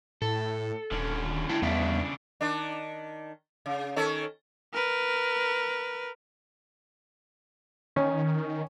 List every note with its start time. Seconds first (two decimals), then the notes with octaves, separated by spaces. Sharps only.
0.22 A2 A4
0.91 D#1 D3 C#4
1.49 E4 G5 A5
1.62 E2 C#3 G3 B3 D4 E5
2.41 D#3 D4
3.66 C#3
3.96 D#3 C#4 A4
4.74 A#4 B4
7.96 D#3 C#4